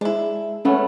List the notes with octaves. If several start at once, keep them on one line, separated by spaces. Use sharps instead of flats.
G#3 D4 E4
A3 B3 C#4